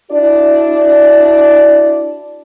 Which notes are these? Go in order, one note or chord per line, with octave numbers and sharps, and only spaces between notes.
D4 E4 F#4 D5